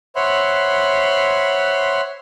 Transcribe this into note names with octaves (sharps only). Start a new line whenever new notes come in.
C5 C#5 E5 F#5 B5 C6